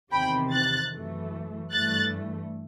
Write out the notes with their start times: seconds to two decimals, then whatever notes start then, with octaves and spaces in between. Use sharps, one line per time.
0.12 E2 C3 D#3 G5 B5
0.52 F#6 A6
0.92 F#2 E3 A3
1.72 G2 E3 A3 F#6 A6